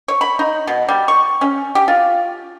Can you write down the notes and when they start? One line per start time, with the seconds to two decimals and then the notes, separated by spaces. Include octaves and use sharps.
0.08 C#5
0.21 B5
0.39 D#4
0.67 B2
0.89 G3
1.08 C#6
1.41 C#4
1.75 G4
1.88 F4